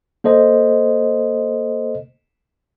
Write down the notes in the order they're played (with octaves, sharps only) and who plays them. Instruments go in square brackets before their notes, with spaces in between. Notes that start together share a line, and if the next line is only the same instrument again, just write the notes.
[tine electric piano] A#3 A4 C5 D#5